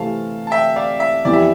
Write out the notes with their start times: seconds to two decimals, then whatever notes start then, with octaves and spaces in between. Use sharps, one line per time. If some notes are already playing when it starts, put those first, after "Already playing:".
Already playing: C3 E3 A3 C4 F5 A5
0.47 A5
0.51 E5 G5
0.76 D5 F5
1.00 E5
1.25 F2 E3 B3 E4 G4 D5
1.33 E5